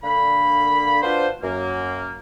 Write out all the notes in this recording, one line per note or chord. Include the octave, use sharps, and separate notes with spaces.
D3 A#3 B5
D4 F4 F#4 B4 C5
F#2 A#3